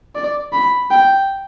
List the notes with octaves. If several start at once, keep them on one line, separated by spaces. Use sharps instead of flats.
D5
B5
G5